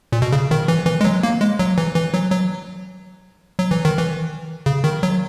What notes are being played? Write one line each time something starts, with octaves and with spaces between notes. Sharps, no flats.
A#2
B2
C#3
D#3
E3
E3
G#3
F#3
A#3
G#3
F#3
E3
E3
F#3
F#3
F#3
E3
D#3
E3
C#3
D#3
F#3